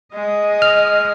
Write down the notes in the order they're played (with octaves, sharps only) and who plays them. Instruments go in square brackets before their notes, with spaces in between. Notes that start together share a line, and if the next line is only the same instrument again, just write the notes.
[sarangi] G#3 [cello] D#5
[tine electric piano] F6